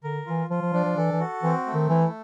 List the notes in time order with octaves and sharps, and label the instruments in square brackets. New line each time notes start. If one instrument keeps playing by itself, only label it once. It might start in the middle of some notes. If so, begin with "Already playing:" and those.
[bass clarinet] D3 [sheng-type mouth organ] A#4
[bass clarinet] E3 [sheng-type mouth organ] F4
[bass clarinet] F3 [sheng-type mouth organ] F4
[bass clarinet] F3
[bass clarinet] F3 [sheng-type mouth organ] D4
[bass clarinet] F3
[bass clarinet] E3 [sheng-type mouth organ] A4
[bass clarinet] E3
[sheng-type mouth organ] F#4
[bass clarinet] E3 [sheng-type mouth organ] C4
[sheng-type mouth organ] A3
[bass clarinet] D#3
[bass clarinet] E3 [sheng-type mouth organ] E4